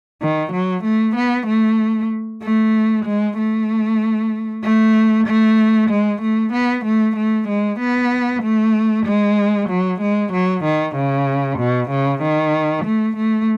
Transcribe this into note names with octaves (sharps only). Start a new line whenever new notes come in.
D#3
F#3
A3
B3
A3
A3
G#3
A3
A3
A3
G#3
A3
B3
A3
A3
G#3
B3
A3
G#3
F#3
G#3
F#3
D#3
C#3
B2
C#3
D#3
A3
A3